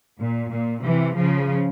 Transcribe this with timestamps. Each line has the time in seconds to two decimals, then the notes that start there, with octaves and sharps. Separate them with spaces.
0.18 A#2
0.50 A#2
0.83 C3 E3
1.16 C#3 F3